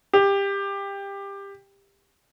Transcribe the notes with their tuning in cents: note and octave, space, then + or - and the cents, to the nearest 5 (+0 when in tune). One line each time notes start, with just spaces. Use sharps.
G4 +20